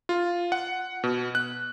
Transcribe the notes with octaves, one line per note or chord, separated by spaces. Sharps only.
F4
F#5
B2
F#6